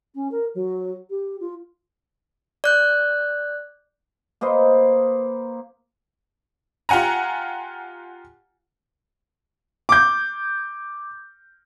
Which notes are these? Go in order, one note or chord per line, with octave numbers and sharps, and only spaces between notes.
C#4
A#4
F#3
G4
F4
D5 F#6 G6
A#3 B4 C5 D#5
F4 G4 F#5 G#5 A#5
D6 G6